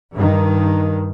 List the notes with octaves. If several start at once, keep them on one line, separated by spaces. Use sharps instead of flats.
G2 D#3